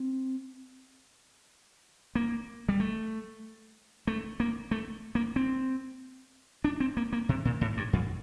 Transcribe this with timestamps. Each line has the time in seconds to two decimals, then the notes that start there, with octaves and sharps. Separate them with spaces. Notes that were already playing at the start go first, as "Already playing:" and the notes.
Already playing: C4
2.15 A#3
2.69 G3
2.80 A3
4.07 A3
4.40 A#3
4.71 A3
5.15 A#3
5.36 C4
6.64 D4
6.80 C4
6.97 A#3
7.13 A#3
7.29 C3
7.45 A#2
7.61 A2
7.77 G2
7.93 F2